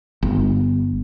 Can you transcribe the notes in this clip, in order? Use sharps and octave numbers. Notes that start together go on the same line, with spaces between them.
G1